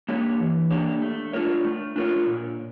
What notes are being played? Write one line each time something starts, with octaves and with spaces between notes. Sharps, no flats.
A#3 D4 G4 C#5
E3
A#3 D4 G4 C#5
A3
D4 F4 A#4 C#5
A3
D4 F4 A#4 C#5
A#2